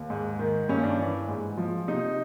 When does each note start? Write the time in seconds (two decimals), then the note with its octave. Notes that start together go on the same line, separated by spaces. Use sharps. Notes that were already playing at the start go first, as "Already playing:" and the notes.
Already playing: D#2
0.10 G#2
0.39 D#3
0.69 G2 C#4
0.83 D4
0.99 E3
1.28 G#2
1.57 F3
1.88 C3 D#4